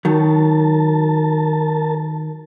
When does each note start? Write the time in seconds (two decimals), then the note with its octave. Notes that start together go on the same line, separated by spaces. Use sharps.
0.05 D#3 F#3 A#4 A5